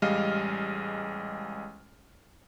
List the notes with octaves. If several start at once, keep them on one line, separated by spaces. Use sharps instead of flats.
A1 G3 G#3 D#5 F5 F6